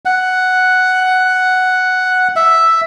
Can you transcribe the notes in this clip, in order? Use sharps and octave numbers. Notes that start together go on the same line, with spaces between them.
F#5
E5